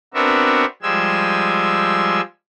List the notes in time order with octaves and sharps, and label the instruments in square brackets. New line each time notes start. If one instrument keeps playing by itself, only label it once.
[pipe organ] B3 C4 D4 F#4 A#4 E5
F3 G3 G#3 G#5 E6